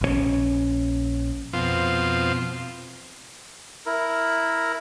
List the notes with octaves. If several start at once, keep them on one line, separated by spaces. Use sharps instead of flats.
A#1 C#3 C#4
F2 B2 C4 F4
E4 A#4